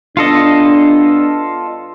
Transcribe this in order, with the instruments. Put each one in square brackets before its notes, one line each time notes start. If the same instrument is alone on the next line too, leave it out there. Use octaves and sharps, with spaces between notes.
[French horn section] G2 B3 D4 [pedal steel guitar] F4 A4 D#5